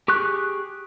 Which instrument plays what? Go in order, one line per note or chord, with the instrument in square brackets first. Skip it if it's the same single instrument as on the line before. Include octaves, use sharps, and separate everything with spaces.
[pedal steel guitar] G4 G#4 C#6 F#6